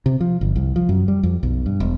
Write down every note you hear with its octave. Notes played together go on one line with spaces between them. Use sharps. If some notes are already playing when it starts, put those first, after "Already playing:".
C3
F3
G1
C2
F3
F#2
G3
F2
B1
G2
E1